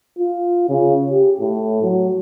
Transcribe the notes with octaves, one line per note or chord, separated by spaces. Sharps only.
F4
C#3
G4
A2
F#3